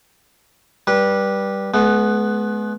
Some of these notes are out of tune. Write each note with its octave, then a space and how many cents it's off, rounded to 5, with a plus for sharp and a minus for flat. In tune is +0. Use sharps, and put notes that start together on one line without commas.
G3 +0 B4 -20
G#3 +40 B3 +0